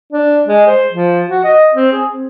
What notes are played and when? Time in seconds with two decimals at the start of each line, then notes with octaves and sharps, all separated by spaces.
0.12 D4
0.47 G#3
0.67 C5
0.93 F3
1.30 F#4
1.44 D#5
1.74 C4
1.92 G#4
2.12 C4